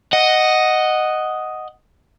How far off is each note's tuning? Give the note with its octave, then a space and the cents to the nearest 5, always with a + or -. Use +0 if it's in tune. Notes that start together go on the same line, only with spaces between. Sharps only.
D#5 +0 F#5 +0